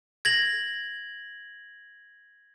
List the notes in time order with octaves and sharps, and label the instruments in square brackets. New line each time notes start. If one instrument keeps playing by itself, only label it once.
[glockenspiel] G#6 A#6 F#7